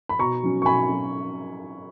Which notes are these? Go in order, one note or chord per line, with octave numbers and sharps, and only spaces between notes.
B5
B2 A#5 C#6
F#3 C#4
C#6
B2 G#5 B5
F#3 C#4